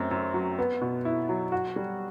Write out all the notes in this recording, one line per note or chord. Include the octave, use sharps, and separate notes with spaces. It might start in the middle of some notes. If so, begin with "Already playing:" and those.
Already playing: F#2 A3 C4
F#2
F#3
B3
B2
E4
F#3
F#4
G3